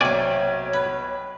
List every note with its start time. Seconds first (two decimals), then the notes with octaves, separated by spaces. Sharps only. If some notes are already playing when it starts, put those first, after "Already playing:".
0.01 B1 C3 A#3 C#5 D5 G5 G#5
0.73 B4